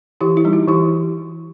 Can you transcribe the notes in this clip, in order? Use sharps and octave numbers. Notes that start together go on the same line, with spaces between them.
E3 E4 G4
E4
G3 D#4
F#4
E3 E4 G4